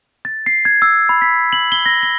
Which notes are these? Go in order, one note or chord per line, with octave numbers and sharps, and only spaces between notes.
A6
C7
G#6
E6
B5
B6
F#7
G7
A#6
G7